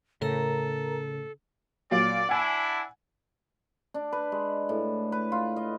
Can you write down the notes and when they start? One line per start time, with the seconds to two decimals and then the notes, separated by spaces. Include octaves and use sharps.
0.22 A2 C#3 A4 A#4 A#5
1.91 A#2 F#3 D5 F5
2.29 D4 E4 F#5 G#5
3.94 D4
4.13 B4
4.32 G#3
4.69 A2
5.12 B4
5.32 F4
5.56 D#5